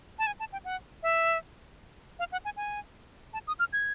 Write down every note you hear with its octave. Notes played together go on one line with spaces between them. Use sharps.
A5
G#5
A5
G5
F#5
E5
F5
F#5
G#5
G#5
A5
D#6
F6
G#6